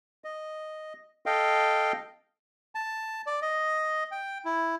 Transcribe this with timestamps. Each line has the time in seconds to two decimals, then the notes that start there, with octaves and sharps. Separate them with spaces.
0.24 D#5
1.26 A4 D#5 F5 G5
2.75 A5
3.27 D5
3.42 D#5
4.11 G5
4.45 E4